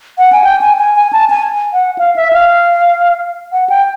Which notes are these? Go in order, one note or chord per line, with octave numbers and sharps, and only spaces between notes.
F#5
G#5
G5
G#5
G#5
G#5
A5
G#5
F#5
F5
E5
F5
F#5
G5